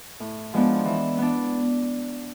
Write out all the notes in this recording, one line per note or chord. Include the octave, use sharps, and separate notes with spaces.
A2
F3 G#3 B3 D4
E3
B3 D4